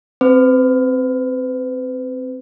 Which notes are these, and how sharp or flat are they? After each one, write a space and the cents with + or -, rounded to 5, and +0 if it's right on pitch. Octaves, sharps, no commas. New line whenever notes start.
C4 +0 B4 +40